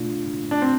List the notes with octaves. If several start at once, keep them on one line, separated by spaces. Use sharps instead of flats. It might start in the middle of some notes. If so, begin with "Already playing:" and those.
Already playing: B2 A3 D4 F4
D4
C4